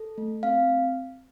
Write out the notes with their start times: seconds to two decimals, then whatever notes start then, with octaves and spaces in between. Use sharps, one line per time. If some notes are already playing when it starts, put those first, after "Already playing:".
Already playing: A4
0.18 A3
0.43 C4 F5